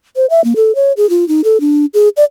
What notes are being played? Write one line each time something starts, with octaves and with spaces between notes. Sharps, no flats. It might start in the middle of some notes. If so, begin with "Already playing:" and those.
C5
E5
A#3
A4
C#5
G#4
F4
D#4
A4
D4
G#4
D5